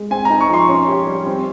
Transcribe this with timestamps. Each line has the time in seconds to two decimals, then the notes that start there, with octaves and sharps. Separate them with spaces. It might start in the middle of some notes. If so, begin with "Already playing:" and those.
Already playing: G#3
0.11 C4 G#5
0.25 D#4 A#5
0.41 C#6
0.50 F3 C6
0.68 C#4
0.87 G4
1.07 G3
1.26 C4